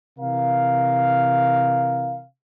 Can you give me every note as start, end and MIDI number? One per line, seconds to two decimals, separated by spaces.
0.19 2.22 48
0.19 2.22 52
0.19 2.22 70
0.19 2.22 77